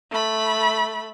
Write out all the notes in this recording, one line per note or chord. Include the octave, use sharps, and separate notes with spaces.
A3 B5